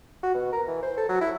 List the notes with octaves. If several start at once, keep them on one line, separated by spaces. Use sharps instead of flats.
F#4
B2
A#4
E3
C5
A4
F#3
E4